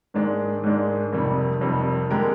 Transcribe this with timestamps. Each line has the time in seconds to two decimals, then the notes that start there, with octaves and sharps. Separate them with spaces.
0.14 G#2 D#3 G#3 D4
0.63 G#2 D#3 G#3 D4
1.13 F2 C3 D#3 G3
1.61 F2 C3 D#3 G3
2.11 D3 G#3 G4 A#4